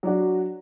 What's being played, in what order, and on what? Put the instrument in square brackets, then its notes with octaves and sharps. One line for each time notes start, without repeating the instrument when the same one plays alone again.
[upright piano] F#3 D4 F#4